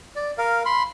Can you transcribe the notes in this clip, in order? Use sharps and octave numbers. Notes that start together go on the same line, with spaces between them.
D5
A#4 F5
B5 C6